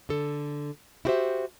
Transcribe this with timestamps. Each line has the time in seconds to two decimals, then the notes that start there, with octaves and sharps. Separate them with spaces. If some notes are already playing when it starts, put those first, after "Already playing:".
0.09 D3 A4
1.05 E4 F#4 G4 B4 C5 E5